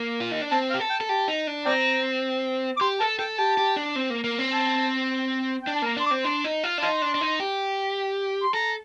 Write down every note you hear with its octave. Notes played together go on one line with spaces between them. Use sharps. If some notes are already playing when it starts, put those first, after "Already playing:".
Already playing: A#3
F4
D#4
D4
C4 A5
F5
G4
A4
G5
A4
G4 A5
D#4
D4
C4 D5 G5 A#5
D6
G4 C6
A4 A5
A4 G5
G4 A5
G4
D4
C4
A#3
A#3
C4
A5
D4 G5
A5
A#3 A#5
D4 C6
D6
C4
D4 C6
D#4
F4
D4
D#4 F5 A5 C6
D4
D4
D#4
G4
C6
A4 A#5